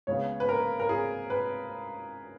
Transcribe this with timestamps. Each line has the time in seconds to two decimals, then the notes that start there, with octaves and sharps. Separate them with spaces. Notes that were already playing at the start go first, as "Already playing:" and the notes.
0.07 C#2 C#3 G#3 B3 C#5
0.40 B4
0.49 A#4
0.80 A#4
0.89 G#4
1.30 B4